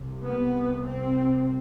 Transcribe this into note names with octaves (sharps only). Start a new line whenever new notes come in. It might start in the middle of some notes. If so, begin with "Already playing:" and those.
Already playing: C2 C3
B3
C4